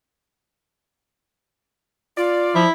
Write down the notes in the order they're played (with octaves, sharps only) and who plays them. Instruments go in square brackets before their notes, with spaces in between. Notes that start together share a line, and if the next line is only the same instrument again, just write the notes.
[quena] F4 [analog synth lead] D5
[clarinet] F3 [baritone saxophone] E4